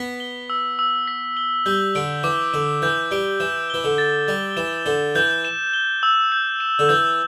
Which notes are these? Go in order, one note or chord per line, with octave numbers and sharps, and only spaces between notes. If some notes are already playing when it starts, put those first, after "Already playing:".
Already playing: B3 B6
G7
E6
E6
B6
G7
G3 G6
D3 D7
E3 D6
D3 D6
E3 G6
G3 D7
E3 E7
E3 G7
D3
A6
G3 A6
E3 E7
D3 G7
E3 G6
E7
G7
E6
G6
E7
D3
E3 G6